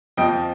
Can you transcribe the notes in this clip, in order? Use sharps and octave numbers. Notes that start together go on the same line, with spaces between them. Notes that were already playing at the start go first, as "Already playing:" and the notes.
F2 F3 D#5 G5